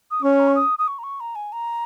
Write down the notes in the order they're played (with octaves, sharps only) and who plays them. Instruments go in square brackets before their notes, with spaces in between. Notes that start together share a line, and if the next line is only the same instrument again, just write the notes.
[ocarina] D#6
[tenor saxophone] C#4 [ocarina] C#6
[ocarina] A#5
C#6
D#6
D#6
C#6
A#5
C#6
A#5
G#5
A#5